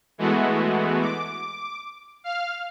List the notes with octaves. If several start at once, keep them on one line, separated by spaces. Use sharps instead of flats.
E3 G#3 A3 B3 F#4
D6
F5 F6